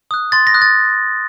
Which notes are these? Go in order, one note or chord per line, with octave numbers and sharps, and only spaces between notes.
D#6 F#6
C6 A6
A#6
D#6 F#6
A6